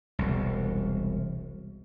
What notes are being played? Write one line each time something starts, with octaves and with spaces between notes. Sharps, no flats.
E1 C2